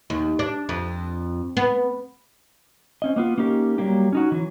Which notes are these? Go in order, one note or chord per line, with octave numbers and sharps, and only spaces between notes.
D#2
D4
F2
B3
C4 C#4 D#5
A#3 B3 F4
A#3 C#4 D#4 G4 A#4
F#3 G3 A#3 G4
C#4 D#4 F#4
E3 F#3